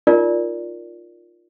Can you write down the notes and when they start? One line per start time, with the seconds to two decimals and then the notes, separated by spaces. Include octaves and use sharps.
0.07 D#4 F4 A#4 D5